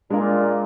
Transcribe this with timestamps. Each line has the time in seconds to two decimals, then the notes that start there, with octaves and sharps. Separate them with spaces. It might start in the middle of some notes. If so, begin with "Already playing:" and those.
0.10 A#2 G#3 D4 F4 A#4